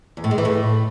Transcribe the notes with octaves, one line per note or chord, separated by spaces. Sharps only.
E2
A2
G#3
E3
A2